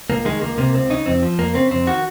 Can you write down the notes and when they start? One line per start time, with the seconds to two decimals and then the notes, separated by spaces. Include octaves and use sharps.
0.10 C#2 A#3
0.25 D#3 G#3
0.41 C#2 A#3
0.58 C3 A#3
0.74 C#2 C4
0.90 C#3 D#4
1.06 F2 C4
1.22 F3
1.39 F2 A#3
1.55 C#3 C4
1.71 F2 C4
1.87 D#3 F#4